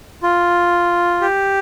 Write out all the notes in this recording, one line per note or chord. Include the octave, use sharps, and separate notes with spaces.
F4
G4